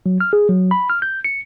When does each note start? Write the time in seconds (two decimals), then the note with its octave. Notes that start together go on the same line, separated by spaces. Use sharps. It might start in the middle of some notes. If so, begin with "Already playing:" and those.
0.06 F#3
0.20 F6
0.33 G#4
0.49 F#3
0.71 B5
0.90 F6
1.02 G6
1.24 C#7